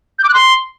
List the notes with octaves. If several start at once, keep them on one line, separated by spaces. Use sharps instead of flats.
G6
D6
F#6
C6